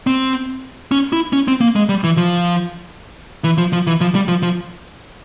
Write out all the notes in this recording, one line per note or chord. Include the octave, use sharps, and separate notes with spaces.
C4
C#4
E4
C#4
C4
A#3
G#3
G3
E3
F3
E3
F3
F3
E3
F3
G3
F3
F3